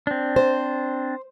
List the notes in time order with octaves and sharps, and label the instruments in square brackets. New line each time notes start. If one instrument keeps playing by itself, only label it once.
[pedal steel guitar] C4 D4
[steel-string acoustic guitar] C5